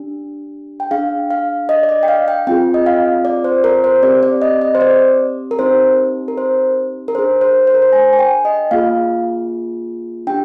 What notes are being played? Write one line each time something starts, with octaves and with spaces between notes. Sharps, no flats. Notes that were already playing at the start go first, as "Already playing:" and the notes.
Already playing: D4 G4
G5
D4 G#4 F5
F5
D#5
D5
D#5
G5
F5
G5
C4 F4 G#4 G5
D#5
F5
D5
C5
A#4
C5
C4 G4 D5
D5
D#5
D#5
C5
D5
A#4
C4 D#4 G4 C5
A#4
C5
A#4
D4 G#4 C5
C5
C5
A#4
C5
G#5
G#5
G5
D#5
A#3 F4 G#4 F5
D4 G4 G5